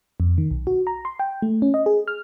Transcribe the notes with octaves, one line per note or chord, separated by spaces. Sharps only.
F2
D#3
B1
F#4
A#5
C6
G5
A3
C#4
D#5
G#4
F6